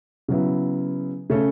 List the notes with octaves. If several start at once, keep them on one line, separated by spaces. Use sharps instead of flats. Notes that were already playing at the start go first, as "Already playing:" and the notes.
C#3 F#3 B3 E4
C#3 A3 C#4 A4